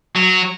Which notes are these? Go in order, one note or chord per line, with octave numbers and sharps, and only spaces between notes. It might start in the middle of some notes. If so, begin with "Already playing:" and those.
F#3